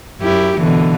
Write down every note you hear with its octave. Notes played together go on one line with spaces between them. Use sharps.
F#2 E4 G4
B2 D3 E3